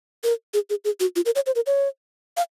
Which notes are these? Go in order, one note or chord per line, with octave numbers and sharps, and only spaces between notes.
A#4
G#4
G#4
G#4
F#4
F4
A#4
C#5
C5
A#4
C#5
F5